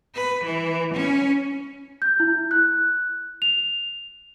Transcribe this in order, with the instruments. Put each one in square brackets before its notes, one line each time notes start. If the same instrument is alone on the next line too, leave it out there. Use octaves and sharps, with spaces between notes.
[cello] B4
E3
C#4
[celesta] G6
E4
F#6
F7